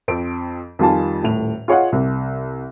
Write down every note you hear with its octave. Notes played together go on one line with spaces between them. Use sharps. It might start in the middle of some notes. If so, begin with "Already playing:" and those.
F2 C4 D7
F2 D#3 G3 F4 G#5 A5
D#1 A2 F7
F4 G#4 C#5 D#5 F5 F#5
C2